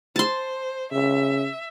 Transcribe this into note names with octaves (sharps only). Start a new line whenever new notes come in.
C5 A5 C6
C#3 E5